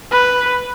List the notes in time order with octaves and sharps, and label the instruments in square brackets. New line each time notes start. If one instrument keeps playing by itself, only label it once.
[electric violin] B4